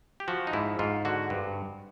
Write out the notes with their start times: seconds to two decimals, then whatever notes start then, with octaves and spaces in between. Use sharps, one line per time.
0.20 G4
0.28 F3 F#4
0.47 D#4
0.53 G#2 E4
0.79 G#2 F4
1.05 D3 F#4
1.30 G2